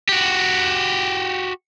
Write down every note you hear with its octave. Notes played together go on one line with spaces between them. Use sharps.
F#4 G4